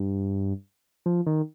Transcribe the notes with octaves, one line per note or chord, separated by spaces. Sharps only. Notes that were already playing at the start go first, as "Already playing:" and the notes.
Already playing: G2
F3
D#3